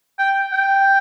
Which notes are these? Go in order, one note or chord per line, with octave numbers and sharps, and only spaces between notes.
G5
G5